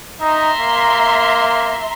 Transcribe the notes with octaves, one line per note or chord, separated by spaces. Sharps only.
D#4 E5 A#5 C6
A#3